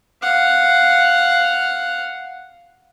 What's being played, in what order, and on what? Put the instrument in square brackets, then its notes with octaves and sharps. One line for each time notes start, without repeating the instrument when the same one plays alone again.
[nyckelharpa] F5 F#5